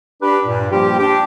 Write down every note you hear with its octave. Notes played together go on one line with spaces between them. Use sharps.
D4 G4 B4
G2 A#2
F3 G3 A#3 F4 G4
D4 G4